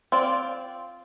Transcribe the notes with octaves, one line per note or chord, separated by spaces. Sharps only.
C4 F4 D5